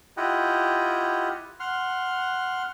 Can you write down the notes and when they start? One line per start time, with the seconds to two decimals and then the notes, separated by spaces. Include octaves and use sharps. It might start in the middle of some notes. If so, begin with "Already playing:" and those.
0.17 E4 F4 G4 D#5 F#5 G5
1.60 F#5 C6 F6